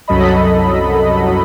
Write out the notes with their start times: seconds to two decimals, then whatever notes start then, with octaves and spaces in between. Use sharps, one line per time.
0.08 C2 F#2 F#3 A4 D#5 B5